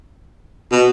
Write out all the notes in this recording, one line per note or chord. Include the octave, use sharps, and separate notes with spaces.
B2